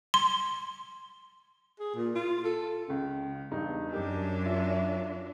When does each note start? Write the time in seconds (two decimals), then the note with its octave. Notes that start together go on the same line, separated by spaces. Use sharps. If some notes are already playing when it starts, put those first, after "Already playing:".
0.14 C6
1.80 G#4
1.95 A#2
2.15 F4
2.45 A4
2.88 C#2 C#3
3.51 E2 G2 D#4
3.92 F#2 D4 G4 A#4
4.45 F4 E5